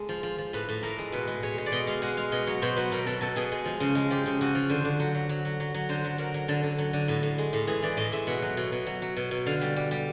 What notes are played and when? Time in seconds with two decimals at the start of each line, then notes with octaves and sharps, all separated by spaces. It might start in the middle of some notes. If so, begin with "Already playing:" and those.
Already playing: G#3 A4
0.09 F3
0.23 F3
0.38 F3
0.53 A2 B4
0.69 A2
0.83 A2 A#4
0.99 G#3
1.12 B2 B4
1.28 G#3
1.43 G#3 C#5
1.58 G#3
1.66 D5
1.72 B2 D#5
1.87 G#3 F5
2.02 G#3 F#5
2.17 G#3 F5
2.32 B2 D#5
2.47 F#3 C#5
2.62 B2 C5
2.76 F#3 B4
2.92 B2 A#4
3.06 B2 A4
3.21 B2 A4
3.36 B2 G#4
3.52 G#3
3.65 F3
3.80 C#3
3.95 G#3
4.11 F3 G4
4.26 C#3
4.41 C#3 F#4
4.55 F3
4.70 D3 C5
4.85 D3
5.00 F#3
5.14 F#3
5.29 F#3
5.45 F#3
5.60 F#3
5.74 F#3
5.89 D3 C5
6.05 F#3
6.18 F#3 A#4
6.34 F#3
6.48 D3 A4
6.63 D3
6.78 F#3
6.93 D3
7.08 A2
7.23 A2
7.38 G#3
7.53 A2
7.67 E3 G#4
7.83 E3 D5
7.97 A2 D#5
8.12 G#3 E5
8.27 B2 F#5
8.42 F#3
8.57 B2
8.72 B2
8.87 F#3
9.02 F#3
9.17 B2
9.31 B2
9.46 D3 F5
9.61 G3
9.76 G3
9.91 G3